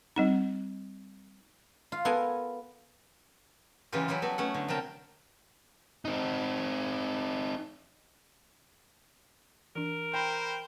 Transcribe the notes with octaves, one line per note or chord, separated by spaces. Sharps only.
G3 C4 D#4
F4
B3 A4 A#4 G#5
C#3 E3 F#3 G#3 F4 G4
F#3 G3 E4 G4
B3 F#4 A4
A3 B3 C#4 F#5
D3
C3 F#3 A#4 G5 A5
C4 D#4
E3 D4 A#4
C5 G5 A#5 B5